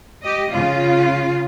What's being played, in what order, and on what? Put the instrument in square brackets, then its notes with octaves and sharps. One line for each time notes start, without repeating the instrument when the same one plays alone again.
[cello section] G4 D#5
C#3 F4